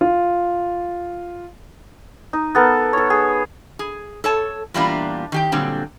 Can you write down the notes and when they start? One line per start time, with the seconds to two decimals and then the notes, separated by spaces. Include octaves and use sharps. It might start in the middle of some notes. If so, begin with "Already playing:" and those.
0.01 F4
2.33 D#4
2.55 B3 A4 A#4
2.93 A4 C#5
3.10 G#4
3.79 G#4
4.24 A4 C#5 A5
4.74 E2 A#2 G3 A#3 D4 F4
5.32 D#3 G4 G5
5.52 A#2 D3 F#3 G3 C4